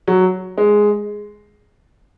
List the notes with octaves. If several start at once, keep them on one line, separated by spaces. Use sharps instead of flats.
F#3
G#3